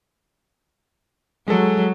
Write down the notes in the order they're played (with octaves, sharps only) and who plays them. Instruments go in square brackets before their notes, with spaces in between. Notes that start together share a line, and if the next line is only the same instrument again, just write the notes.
[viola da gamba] F#3 [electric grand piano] G#3 A4